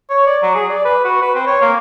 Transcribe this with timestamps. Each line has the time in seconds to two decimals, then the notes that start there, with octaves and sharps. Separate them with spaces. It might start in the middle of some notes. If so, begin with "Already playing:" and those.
0.10 C#5
0.26 D5
0.42 F#3
0.55 G#4
0.69 D5
0.85 B4
1.05 F#4
1.22 B4
1.35 C4
1.47 C#5
1.61 A#3